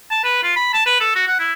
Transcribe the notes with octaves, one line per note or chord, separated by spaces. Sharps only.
A5
B4
F4
B5
A5
B4
A4
F#4
F#5
E4